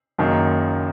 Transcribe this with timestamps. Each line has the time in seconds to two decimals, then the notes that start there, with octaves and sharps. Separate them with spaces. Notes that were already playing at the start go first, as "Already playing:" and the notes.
0.18 F#1 F#2 D#3 A#3